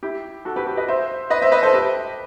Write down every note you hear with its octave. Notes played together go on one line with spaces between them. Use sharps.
E4 G4
F#4 A4
G4 B4
G4 B4
B4 D#5
C5 E5
B4 D#5
C5 E5
B4 D#5
A4 C5
G4 B4